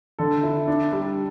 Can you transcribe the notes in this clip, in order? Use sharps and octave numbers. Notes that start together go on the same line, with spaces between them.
D3 A4
E4
D4
G3